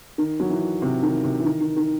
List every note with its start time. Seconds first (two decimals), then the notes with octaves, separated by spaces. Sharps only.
0.18 D#3
0.40 F#3
0.50 E3
0.82 C3
1.03 D#3
1.24 C3
1.40 E3
1.45 D#3
1.61 D#3
1.76 D#3